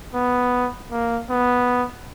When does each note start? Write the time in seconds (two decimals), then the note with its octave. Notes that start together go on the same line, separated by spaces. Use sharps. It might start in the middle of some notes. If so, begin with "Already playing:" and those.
0.14 B3
0.91 A#3
1.29 B3